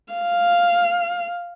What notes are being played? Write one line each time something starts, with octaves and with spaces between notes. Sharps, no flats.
F5